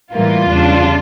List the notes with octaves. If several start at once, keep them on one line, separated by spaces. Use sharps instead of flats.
A2 E3 G3 A#3 F4
E2 C#3 G3 D4